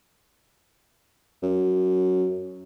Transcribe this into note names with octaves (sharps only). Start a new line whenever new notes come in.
F#2